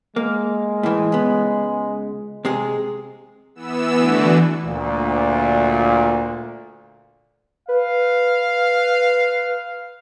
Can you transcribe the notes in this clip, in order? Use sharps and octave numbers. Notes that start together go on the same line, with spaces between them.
G#3 A#3
A2 E3
C#2 B3
C3 G#3 G#4
E3 B3 E6
D3 E3 A3 D4 F#4
D2 A#2
B4 F5